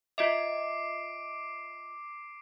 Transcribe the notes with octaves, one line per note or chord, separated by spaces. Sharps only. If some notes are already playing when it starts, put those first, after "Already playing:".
F4 D#5 E5 D6 C7 D7